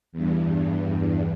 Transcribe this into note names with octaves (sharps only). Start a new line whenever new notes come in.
E2 G2